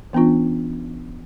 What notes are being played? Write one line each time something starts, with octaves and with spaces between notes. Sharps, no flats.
E3 B3 C#4 D4 F4